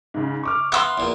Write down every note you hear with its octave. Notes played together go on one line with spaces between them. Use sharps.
G#2 C#3
C#6 D6 F6
B3 E5 F5 C6 E6 F#6
E2 A#2